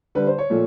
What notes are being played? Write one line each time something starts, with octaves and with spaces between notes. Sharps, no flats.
D3 G3 B4
C5
C#5
A#2 F3 A3